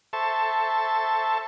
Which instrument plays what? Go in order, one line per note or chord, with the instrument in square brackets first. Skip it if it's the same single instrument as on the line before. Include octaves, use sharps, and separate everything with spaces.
[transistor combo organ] A4 C5 E5 A5 C#6